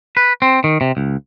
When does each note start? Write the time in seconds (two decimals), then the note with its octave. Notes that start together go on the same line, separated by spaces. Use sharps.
0.17 B4
0.42 C4
0.64 D#3
0.81 C3
0.97 C#2